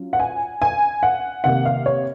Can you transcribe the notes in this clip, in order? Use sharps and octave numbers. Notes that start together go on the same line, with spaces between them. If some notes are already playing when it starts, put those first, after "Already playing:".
Already playing: F#3 C#4 F4
F#5
G#5
G#5
F#5
C3 D#3 A#3 F#5
F5
C#5